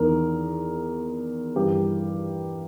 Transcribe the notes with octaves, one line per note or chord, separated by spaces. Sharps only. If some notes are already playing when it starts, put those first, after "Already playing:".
Already playing: E2 D#3 A#4
G2 E3 G4